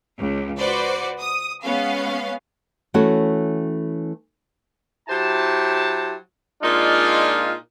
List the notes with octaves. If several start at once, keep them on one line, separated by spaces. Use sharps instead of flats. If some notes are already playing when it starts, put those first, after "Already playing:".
C#2
F#4 B4 C5 D5
D#6
G#3 B3 C#4 F5
E3 A3 C#4 F#4 C#5
F#3 E4 G4 C5 A5
A#2 G#3 D4 D#4 F4